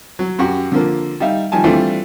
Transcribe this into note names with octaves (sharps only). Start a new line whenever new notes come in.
F#3
F#2 F#4 G4
D3 F3 A#3
G3 D#4 E5 F5
D#3 F3 G3 G#5 A5
E3 G3 A3 C4 D4 F4